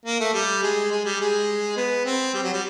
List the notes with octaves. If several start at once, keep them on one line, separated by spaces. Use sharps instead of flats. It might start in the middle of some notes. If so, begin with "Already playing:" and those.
A#3
A3
G3
G#3
G#3
G3
G#3
B3
C4
G3
F#3
G3